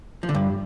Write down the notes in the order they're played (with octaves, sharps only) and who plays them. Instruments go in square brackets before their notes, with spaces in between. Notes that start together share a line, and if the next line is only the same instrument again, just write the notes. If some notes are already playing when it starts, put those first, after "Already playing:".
[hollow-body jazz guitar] F3
D3
G2